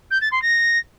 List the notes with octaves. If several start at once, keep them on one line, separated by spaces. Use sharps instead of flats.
G6
A6
C6
A#6